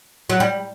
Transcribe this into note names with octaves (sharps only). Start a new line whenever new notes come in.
F#3
G3